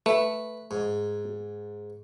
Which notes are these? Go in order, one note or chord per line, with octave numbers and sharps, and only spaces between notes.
A3 B4
G#2